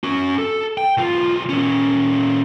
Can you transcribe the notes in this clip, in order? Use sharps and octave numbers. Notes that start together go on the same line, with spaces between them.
C#4 F#4
A4
G5
B1 F4
A#2 C#4